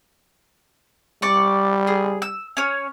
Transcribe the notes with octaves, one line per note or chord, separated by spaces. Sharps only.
G3 D5 C#6
G#4
E6
C#4 C#5